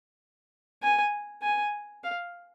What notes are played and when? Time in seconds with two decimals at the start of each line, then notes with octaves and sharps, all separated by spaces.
0.83 G#5
1.43 G#5
2.04 F5